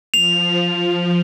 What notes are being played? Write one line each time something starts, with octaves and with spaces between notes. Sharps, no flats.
F3 F7